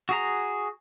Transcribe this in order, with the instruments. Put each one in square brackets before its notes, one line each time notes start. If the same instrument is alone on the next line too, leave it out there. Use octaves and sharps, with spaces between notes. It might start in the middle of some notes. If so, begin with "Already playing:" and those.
[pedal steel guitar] F#4 G#4 A#5